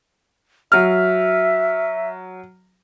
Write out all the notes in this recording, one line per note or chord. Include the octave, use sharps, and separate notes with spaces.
F#3 E5 F6